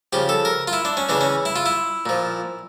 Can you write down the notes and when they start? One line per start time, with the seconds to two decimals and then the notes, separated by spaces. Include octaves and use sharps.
0.13 C#3 F3 G4
0.29 A4
0.45 A#4
0.68 F4
0.73 E4
0.85 D4
0.97 C#4
1.09 C#3 E3 D4
1.21 C#4
1.45 E4
1.56 F4
1.66 E4
2.06 A#2 F3